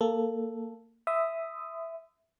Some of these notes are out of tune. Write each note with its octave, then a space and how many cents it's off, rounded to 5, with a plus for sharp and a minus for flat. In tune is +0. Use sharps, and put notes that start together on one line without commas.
A#3 -20 A4 +0
E5 +0 C6 -45 D#6 +0